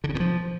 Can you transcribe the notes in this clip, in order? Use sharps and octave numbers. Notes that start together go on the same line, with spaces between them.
D3
C#3
B2
F3